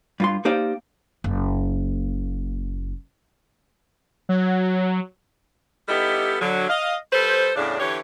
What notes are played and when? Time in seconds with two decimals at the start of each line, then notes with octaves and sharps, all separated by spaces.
0.20 G2 F4 C6
0.45 A#3 D#4 G4 C5 D5 F5
1.24 F#1 A#3
4.29 F#3
5.88 G3 B3 D#4 E4 G4 A4
6.41 D3 F#3
6.69 D#5 F5
7.12 G3 A4 B4 C5
7.56 E2 A2 C#3 D4
7.80 D3 E3 G4 C#5